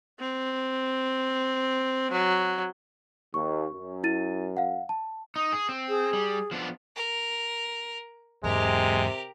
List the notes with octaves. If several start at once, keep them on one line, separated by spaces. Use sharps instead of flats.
C4
F#3
D#2 C#6
F#2
E4 A6 D#7
F5 F#5
A5
D#4 D#6
G#4
C4
G#4
G3
F3 B3 D4
A#4
E2 G#2 C3 G#3 G4 A#4